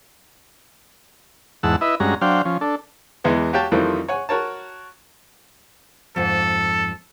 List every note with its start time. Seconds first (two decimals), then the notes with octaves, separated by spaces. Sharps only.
1.63 E2 G#2 F#5 A5 E6
1.81 E4 B4 D#5 E5
2.00 G2 G#3 C#4 F#4 A#5
2.21 F#3 D4 C5 F5 G5
2.45 F3 C#4
2.61 D4 A4
3.24 E2 E3 G#3 B3
3.53 F#4 G4 C#5 F5 G5 A5
3.72 F2 D#3 E3 G3 A3 C4
4.09 C#5 F#5 G#5
4.29 F#4 A#4 C#5 A5
6.16 F2 G#2 A4